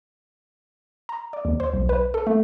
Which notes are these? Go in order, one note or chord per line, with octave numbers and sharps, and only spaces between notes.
A#5
D5
D#2
C5
B1
B4
A4
A3